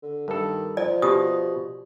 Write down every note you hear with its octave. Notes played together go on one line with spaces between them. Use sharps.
D3
G2 D#3 A4
F3 D5
B2 G4 D#6